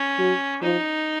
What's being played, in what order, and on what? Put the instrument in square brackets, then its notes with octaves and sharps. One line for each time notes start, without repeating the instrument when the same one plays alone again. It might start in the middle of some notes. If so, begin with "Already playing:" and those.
Already playing: [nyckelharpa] C#4
[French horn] F#3
[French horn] F3 [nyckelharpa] D#4